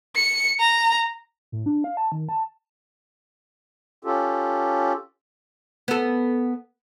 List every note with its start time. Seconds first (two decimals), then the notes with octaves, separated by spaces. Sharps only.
0.16 C#7
0.60 A#5
1.52 A2
1.66 D4
1.84 F5
1.97 A5
2.12 D#3
2.29 A5
4.05 C#4 F4 G4 A4
5.88 B3 A4